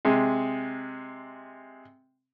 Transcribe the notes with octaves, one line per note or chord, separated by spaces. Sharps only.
C3 G#3